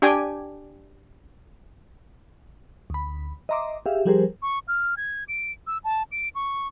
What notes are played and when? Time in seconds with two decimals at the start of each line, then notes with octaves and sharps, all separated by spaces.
0.02 D4 G4 G5 G#5
2.90 D2 B5
3.49 D#5 E5 A#5 C6 D6
3.86 G4 G#4 E5 F5
4.05 F3 G3 G4 G#4 A#4 C5
4.42 C#6
4.68 F6
4.97 G#6
5.28 D7
5.67 E6
5.84 A5
6.12 D7
6.35 C#6